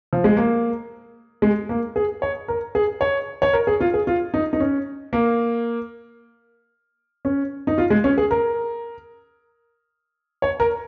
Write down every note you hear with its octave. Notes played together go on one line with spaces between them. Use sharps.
F3
G#3
A#3
G#3
A#3
G#4
C#5
A#4
G#4
C#5
C#5
A#4
G#4
F4
G#4
F4
D#4
D#4
C#4
A#3
C#4
D#4
F4
G#3
C#4
G#4
A#4
C#5
A#4